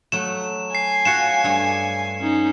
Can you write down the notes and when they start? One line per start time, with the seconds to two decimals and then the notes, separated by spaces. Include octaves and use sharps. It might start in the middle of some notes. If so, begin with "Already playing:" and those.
0.12 F#3 A3 E7
0.75 G#5 C7
1.05 F4 F#4 C#5 C#7 E7
1.44 G2 A3
2.21 C#4 D#4